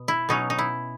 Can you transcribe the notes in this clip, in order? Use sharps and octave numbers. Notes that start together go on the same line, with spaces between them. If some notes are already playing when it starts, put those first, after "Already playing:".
Already playing: B2
E4
B2 F#3 C#4 D#4
D#4
E4